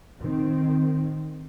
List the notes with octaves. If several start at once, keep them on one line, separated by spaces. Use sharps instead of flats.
D#3 C4